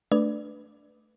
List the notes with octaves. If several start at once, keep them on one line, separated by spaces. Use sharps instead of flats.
A3 D4 B4 D5